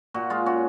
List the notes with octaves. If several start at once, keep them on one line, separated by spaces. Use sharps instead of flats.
A#2 F#4
G#3 F4
C#4 F#4